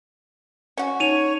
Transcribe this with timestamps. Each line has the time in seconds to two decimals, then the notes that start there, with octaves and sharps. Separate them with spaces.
0.77 C#4 F#4
1.00 D#4 C#5 D#7 F7